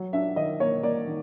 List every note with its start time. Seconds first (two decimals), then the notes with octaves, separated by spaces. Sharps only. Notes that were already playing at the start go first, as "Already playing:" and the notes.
Already playing: F#3
0.13 D4 E5
0.36 D#3 D#5
0.60 A#3 C#5
0.83 A#3 D5
1.07 D#3